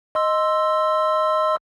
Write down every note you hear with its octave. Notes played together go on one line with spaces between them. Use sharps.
D#5 C6 E6